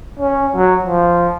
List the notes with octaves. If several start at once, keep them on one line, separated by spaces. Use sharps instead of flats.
C#4
F#3
F3